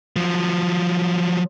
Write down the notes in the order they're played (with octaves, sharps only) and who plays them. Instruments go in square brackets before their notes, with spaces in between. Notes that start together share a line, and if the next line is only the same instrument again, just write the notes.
[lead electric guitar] F3 F#3